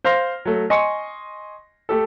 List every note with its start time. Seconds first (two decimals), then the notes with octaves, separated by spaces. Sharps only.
0.04 C5 F5 C6 F6 A#6
0.45 F#3 A3
0.70 D#5 G#5 C6 C#6 C#7
1.89 A3 G4 A4